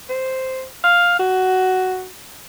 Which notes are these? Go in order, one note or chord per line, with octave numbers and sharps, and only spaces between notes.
C5
F5
F#4